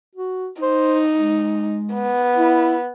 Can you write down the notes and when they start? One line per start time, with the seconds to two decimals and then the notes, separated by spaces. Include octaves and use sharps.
0.15 F#4
0.62 D#4 C5
1.14 G#3
1.94 B3
2.37 E4